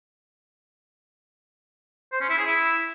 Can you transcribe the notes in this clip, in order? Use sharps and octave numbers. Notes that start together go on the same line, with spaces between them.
C5
C#4
E4
G#4
E4